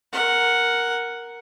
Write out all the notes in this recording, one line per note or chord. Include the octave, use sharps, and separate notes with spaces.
A#4 F#5